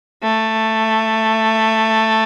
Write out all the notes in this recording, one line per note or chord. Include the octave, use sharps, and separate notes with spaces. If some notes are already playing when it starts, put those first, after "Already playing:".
A3